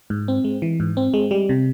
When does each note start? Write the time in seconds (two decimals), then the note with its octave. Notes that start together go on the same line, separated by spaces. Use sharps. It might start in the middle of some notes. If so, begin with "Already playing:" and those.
0.10 G#2
0.28 C4
0.44 G#3
0.62 E3
0.80 G#2
0.97 C4
1.14 G#3
1.31 G3
1.49 C3